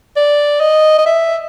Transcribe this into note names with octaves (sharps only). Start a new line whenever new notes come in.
D5
D#5
D#5
E5